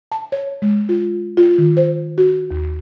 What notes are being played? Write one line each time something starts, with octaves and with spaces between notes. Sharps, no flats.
A5
C#5
G#3
F4
F4
D#3
C5
F#4
D#2